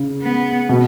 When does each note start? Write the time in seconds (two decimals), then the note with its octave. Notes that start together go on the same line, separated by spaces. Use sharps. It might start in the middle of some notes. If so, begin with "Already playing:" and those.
Already playing: C#3
0.22 B3
0.69 B2